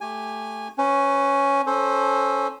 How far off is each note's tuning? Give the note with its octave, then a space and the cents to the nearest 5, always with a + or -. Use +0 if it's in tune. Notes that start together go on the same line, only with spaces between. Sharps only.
A3 +0 G4 +10 G#5 -10
C#4 +0 B4 +30
C#4 +0 A4 -10 C5 +10